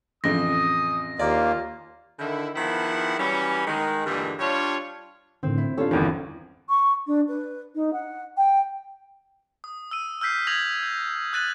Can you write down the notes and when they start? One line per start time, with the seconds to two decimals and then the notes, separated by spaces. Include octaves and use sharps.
0.24 A1 F2 C#3 D#6 A#6
1.19 D#2 A#3 F4 D5
2.19 D3 D#3 E4
2.55 D#3 F3 B3 E4 G#4 F#5
3.19 E3 F#3 G3 C#4
3.67 D#3 G#3
4.06 G2 A#2 D3 E3 G3 G#3
4.40 G3 D4 F4 C#5
5.43 A2 D3 D#3 C4
5.58 E4
5.78 C#4 D4 F4 G4 A4 C#5
5.91 G1 E2 D#3 E3
6.69 C#6
7.07 D4
7.28 B4
7.75 D#4
7.93 F#5
8.37 G5
9.64 D#6
9.91 E6 D#7
10.21 E6 F6 G6 B6 C7
10.47 D#6 G6 G#6 A#6 F7 F#7
10.83 G6
11.33 D#6 F#6 A6 D#7 F#7